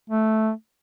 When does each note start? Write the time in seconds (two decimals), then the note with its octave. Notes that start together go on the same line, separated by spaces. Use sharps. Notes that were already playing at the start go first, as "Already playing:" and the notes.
0.10 A3